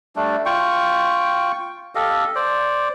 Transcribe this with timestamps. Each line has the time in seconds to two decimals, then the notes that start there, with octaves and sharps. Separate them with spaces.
0.16 G3 A3 D4
0.45 F4 G5 C#6
1.95 G4 A4 D#5 F5
2.35 C5 D5